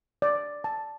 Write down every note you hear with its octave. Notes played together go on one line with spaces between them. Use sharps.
D5
A5